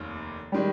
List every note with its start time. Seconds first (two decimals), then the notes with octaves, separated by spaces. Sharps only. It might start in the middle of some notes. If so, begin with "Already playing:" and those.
Already playing: F1 D#2 D#3
0.52 D#3 G3 G#3